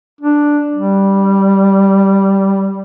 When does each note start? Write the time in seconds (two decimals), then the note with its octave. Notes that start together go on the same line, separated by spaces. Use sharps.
0.21 D4
0.74 G3